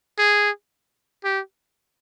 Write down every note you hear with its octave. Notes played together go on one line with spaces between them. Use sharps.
G#4
G4